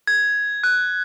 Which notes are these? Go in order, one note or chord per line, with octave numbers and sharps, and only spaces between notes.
G#6
F#6